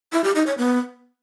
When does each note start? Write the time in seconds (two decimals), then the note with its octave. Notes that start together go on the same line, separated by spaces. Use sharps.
0.13 E4
0.24 G4
0.35 D#4
0.47 C#5
0.58 B3